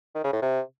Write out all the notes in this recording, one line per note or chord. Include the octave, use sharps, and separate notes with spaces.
D#3
C#3
A2
C3